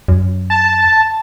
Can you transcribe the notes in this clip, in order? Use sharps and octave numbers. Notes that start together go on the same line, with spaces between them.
F#2
A5